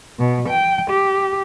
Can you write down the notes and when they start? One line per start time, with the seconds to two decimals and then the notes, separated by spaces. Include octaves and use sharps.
0.18 B2
0.47 G5
0.89 G4